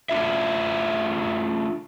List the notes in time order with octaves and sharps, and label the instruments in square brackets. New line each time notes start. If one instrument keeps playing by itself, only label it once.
[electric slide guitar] A3 D4 F4 E5